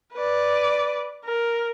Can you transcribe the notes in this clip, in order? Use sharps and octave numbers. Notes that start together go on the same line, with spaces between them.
B4 D5
A#4